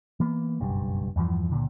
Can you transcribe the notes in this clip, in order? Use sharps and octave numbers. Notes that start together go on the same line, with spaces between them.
E3 A#3 B3
F#1 B1 G2
E2 G2 E3 F3
C#2 A#2 D3